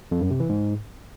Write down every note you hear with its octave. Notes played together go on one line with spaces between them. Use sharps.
F2
F#2
C3
E3
G#2